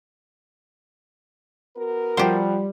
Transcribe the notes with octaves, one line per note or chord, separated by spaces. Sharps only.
B3 F#4 A#4
F3 G3 G4 C5 F#5